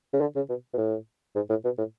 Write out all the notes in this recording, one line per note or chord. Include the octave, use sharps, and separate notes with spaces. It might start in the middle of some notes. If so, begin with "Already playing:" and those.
C#3
D3
C#3
B2
B2
A2
G#2
A2
B2
A2